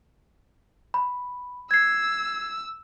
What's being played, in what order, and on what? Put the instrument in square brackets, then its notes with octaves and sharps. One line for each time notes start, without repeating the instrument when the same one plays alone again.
[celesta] B5
[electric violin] E6 [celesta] G#6 C7